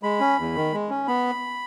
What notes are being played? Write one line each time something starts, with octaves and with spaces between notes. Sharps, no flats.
G#3 B5
C#4
E2
D#3
G#3
C#4
B3 B5